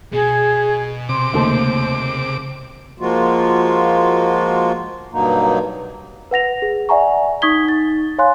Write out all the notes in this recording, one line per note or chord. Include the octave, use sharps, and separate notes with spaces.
B2 G#4
C3 C6 D6
D#2 C#3 A3 C5
F3 G#3 A#3 F4 F#4
G2 B2 F#3 A#3 D#4
B4 F#5 A#6 F7
G#4
D5 E5 F#5 G#5 A#5 C#6
D#4 C#6 D#6 G#6 B6 G7
D#4 A6
C#5 F5 G#5 C6 F#6